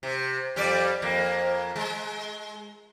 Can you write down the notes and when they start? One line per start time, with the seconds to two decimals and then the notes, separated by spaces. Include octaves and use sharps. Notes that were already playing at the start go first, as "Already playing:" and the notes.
0.03 C3
0.56 F2 G3 D5
1.02 F2 A#3
1.76 G#3